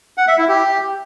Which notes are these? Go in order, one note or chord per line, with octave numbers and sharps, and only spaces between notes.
F#5
E5
E4
G4